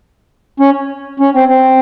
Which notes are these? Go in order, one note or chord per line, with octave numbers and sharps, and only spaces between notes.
C#4
C#4
C4
C4